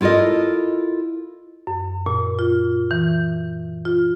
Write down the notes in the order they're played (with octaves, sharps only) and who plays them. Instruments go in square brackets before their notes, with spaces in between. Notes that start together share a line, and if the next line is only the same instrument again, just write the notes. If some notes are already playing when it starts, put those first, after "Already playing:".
[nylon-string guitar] E4 F4 A4 A#4 D#5
[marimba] F#2
A#2
F4
E3
F4